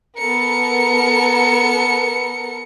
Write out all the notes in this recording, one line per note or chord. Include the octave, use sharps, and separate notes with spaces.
B3 A4 A#4 C#7